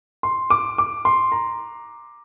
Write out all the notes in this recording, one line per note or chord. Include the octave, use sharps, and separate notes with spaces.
C6
D6
D6
C6
A#5